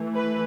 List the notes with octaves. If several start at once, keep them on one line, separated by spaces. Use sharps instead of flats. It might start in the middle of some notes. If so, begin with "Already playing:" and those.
Already playing: E3 A3
B4